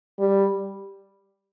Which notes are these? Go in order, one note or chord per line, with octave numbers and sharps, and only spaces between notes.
G3